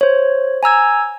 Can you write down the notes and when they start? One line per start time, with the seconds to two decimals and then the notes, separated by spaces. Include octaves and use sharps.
0.01 C5 C#5
0.63 G#5 A#5 E6 G#6